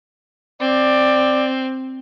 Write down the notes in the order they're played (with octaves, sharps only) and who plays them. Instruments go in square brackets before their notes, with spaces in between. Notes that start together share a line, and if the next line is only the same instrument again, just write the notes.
[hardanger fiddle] C4 [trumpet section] D5